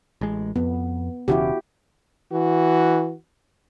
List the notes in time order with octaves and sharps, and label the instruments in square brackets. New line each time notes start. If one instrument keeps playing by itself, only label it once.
[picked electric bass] A1 G#3
[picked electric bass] F2 [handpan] B3
[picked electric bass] E1 C#3 E3 [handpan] E4 F#4 G4
[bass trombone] E3 [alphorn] F#4